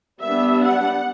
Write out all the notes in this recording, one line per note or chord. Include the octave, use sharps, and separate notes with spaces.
G3 B3 D4 E5
F#5